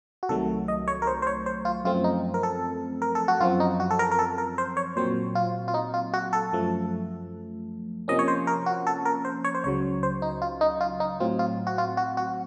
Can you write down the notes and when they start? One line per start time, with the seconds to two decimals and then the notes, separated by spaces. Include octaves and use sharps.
0.23 F#4
0.29 C2 C3 D#3 F#3 A3 A4
0.68 D#5
0.88 C#5
1.02 A#4
1.07 C5
1.22 C5
1.27 C#5
1.46 C5
1.65 F4
1.84 F#2 F3 A3 C4 F4
2.04 D#4
2.34 A#4
2.43 A4
3.02 A#4
3.15 A4
3.28 F#4
3.40 F#2 F3 C4 F4
3.60 D#4
3.80 F#4
3.91 A4
3.99 A#4
4.11 A#4
4.19 A4
4.38 A#4
4.58 C5
4.77 C#5
4.96 A#2 F#3 C4 C5
5.35 F4
5.68 F4
5.74 D#4
5.94 F4
6.14 F#4
6.33 A4
6.52 F#2 F3 A3
8.08 C3 F3 A#3 C#4 D#5
8.19 C#5
8.28 C5
8.47 A#4
8.66 F#4
8.87 A4
9.05 A#4
9.25 C5
9.44 C#5
9.55 C5
9.64 C#2 C#3 F#3 C#5
10.03 C5
10.22 D#4
10.42 F4
10.61 D#4
10.81 F4
11.00 D#4
11.20 A2 F#3 C4 F4
11.39 F4
11.67 F#4
11.78 F4
11.97 F#4
12.17 F#4